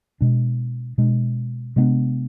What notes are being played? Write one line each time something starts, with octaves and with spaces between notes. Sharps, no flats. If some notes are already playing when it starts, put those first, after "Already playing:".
B2 G#3 D4
B2 G#3 D4
C3 G#3 B3 D4